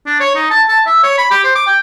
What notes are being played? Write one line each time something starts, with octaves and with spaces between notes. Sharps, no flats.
D4
C#5
D#4
A5
A5
E5
C#5
B5
G4
C5
D6
G5